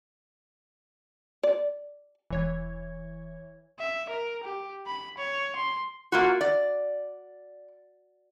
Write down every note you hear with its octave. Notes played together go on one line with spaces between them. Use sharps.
D5
E1 E3 C#5 G#6
E5
A#4
G4
B5
C#5
C6
A#3 F4 F#4
D5